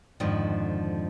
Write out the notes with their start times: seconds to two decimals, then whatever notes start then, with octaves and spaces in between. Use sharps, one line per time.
0.20 F2 G#2 D3 D#3 F3